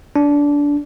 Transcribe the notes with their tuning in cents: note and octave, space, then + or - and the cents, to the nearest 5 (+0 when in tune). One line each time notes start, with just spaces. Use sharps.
D4 -20